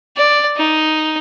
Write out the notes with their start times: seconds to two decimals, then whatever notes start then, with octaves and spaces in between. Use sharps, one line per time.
0.17 D5
0.57 D#4